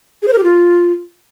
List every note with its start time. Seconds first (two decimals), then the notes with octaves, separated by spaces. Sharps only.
0.22 G#4
0.28 C5
0.33 A#4
0.38 G4
0.43 F4